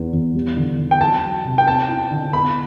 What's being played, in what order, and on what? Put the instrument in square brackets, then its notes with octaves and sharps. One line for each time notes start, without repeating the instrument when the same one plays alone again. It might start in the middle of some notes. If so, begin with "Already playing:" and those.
Already playing: [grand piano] E2 B3
E2
G3
D3
D3
[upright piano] G5
[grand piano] F#3 [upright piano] A5
[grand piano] F#3
C3
[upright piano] G5
[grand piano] C4 [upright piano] A5
[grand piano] E4
D3
[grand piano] B3 [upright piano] B5